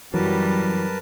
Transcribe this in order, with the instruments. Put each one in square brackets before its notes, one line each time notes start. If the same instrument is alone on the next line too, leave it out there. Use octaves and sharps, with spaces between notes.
[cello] F#2 G3 [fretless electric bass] E3 [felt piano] F#3 [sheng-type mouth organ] A#4 B4 A5